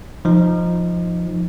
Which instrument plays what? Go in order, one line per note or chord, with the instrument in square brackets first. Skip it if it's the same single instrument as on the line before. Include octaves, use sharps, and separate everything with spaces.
[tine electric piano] F3 D#4